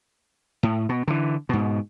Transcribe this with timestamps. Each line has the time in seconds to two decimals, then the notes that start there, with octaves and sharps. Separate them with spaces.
0.63 A2
0.89 B2
1.08 D3 E3
1.49 G#2 B2